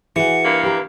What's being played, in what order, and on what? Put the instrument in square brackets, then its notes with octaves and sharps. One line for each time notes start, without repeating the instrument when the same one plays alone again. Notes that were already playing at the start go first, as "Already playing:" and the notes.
[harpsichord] E3 [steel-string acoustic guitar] F#4 G#4 [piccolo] C#7
[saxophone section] G2 A#3
[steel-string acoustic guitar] G4 B4 A#5